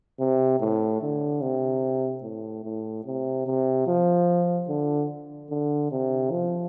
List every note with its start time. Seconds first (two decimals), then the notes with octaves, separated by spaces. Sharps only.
0.19 C3
0.60 A2
1.02 D3
1.42 C3
2.23 A2
2.64 A2
3.05 C3
3.46 C3
3.87 F3
4.69 D3
5.50 D3
5.91 C3
6.32 F3